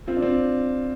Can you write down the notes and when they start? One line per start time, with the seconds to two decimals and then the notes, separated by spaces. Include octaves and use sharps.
0.08 C4 F4
0.17 D4
0.22 C4